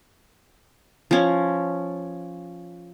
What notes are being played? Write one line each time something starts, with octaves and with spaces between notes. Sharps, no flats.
F3 C#4